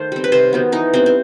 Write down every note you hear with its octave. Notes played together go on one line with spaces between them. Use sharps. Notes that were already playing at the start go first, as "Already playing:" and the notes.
Already playing: D#3 A3 C5
G3 C4
B4
C3 C5
D#3 F#3 B3
E3 D#4
G3 B3 C4
C4